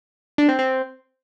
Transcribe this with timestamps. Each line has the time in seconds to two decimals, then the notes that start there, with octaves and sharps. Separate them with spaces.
0.38 D4
0.48 C4
0.59 C4